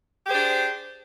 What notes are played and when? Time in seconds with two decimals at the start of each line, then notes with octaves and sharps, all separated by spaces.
0.24 G4
0.28 G#4
0.31 C5
0.34 D4